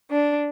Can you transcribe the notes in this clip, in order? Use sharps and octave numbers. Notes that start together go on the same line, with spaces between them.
D4